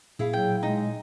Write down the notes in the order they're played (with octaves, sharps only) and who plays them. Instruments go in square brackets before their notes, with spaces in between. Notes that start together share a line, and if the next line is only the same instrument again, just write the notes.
[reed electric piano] A#2 [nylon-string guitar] E4 G#4 F5
[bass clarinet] F#3 [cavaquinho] G5
[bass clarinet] G#3 [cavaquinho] D#4